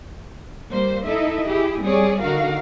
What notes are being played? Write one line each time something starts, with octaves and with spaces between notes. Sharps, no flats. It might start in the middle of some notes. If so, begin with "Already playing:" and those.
G3 A#3 C5
D#4 E4 A4 D#5 E5
E4 G4 G#4
G3 C4 G#4 C#5 D5
D3 D#4 F#4 A#4 F5